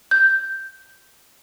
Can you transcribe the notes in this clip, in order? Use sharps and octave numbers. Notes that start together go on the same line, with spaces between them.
G6